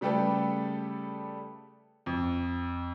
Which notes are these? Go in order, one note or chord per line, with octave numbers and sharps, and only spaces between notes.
C#3 G3 A3 G4 A4 B4
F2